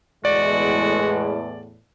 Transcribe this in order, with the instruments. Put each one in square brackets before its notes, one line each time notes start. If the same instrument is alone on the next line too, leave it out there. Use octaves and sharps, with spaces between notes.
[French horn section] E2 A2 [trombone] G#3 [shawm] F#4 [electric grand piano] D5